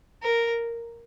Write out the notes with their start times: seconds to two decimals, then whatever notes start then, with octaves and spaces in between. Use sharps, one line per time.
0.23 A#4